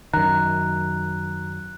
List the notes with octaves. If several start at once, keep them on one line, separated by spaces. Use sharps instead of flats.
F#2 D#3 A#5 F#6